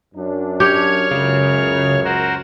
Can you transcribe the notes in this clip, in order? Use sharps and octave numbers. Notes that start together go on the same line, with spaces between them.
F#2 D4
G4 C#5 C#6 F6 G#6
C#2 F#2 C#3
F#4 A#4 C5